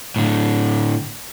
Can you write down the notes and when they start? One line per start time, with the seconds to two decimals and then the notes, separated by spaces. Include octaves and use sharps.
0.16 A2 D3